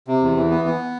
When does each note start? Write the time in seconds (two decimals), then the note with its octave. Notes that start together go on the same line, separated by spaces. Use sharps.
0.07 C3
0.22 E2
0.36 E3
0.51 B3
0.65 B3